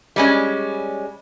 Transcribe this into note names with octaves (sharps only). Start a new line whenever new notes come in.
G3 G#3 C#4